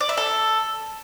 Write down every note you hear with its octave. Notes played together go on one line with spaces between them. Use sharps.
D5
E5
A4